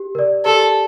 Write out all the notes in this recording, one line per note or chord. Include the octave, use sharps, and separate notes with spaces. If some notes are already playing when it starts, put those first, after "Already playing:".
Already playing: G4
A#4 D5
G4 A4